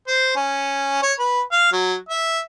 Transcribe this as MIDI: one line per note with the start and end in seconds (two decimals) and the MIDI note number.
0.07 0.33 72
0.36 1.02 61
1.02 1.13 73
1.19 1.41 71
1.52 1.70 77
1.72 1.95 54
2.09 2.39 76